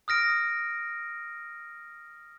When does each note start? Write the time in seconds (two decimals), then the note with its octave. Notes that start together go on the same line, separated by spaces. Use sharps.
0.08 D#6 F6 A#6 D7